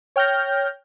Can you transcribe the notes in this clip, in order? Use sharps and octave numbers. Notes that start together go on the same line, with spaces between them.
C#5 G5 F6 G6 A#6